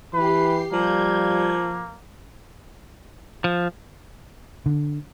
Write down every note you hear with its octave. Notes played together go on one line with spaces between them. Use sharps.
E3 G4 B4 C7
F3 G3 A#3 G6 G#6
F3
D3